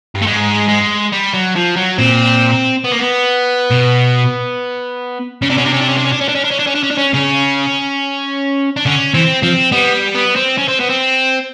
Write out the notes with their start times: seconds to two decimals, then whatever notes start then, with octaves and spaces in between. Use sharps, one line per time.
0.15 G2
0.22 A3
0.26 G#2 G#3
0.69 G#3
1.13 G3
1.34 F#3
1.56 F3
1.76 F#3
1.98 A#2 C4
2.84 B3
2.92 A#3
2.99 B3
3.71 B2
5.42 C#3 C#4
5.50 C3 D4
5.57 B2 C#4
5.65 C3 D4
5.73 C#4
5.81 D4
5.89 C#4
5.97 D4
6.05 C#4
6.12 D4
6.21 C#4
6.28 D4
6.35 C#4
6.44 D4
6.51 C#4
6.59 D4
6.67 C#4
6.75 D4
6.83 C#4
6.90 D4
6.97 C#4
7.14 C#3 C#4
8.76 D4
8.86 D3 C#4
9.14 E3 C4
9.43 F3 C4
9.72 G3 B3
10.15 B3
10.36 C4
10.58 C#4
10.68 C4
10.80 B3
10.90 C4